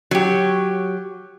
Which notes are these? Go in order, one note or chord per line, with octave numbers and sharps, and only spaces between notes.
F#3 G4